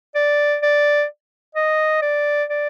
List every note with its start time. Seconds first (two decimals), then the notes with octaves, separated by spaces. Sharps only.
0.15 D5
0.62 D5
1.55 D#5
2.02 D5
2.50 D5